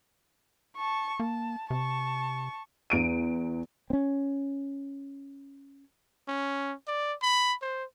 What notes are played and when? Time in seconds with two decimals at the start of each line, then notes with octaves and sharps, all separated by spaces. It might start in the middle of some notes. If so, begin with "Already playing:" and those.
0.77 A5 C#6
1.20 A#3 A5
1.70 C3 A5 C#6
2.90 E2 D7 D#7
3.90 C4 C#4
6.28 C#4
6.88 D5
7.22 B5
7.62 C5